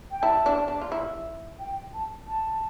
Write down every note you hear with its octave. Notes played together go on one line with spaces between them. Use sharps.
G5
E4 A5
D4
D4
F4
E4
G5
A5
A5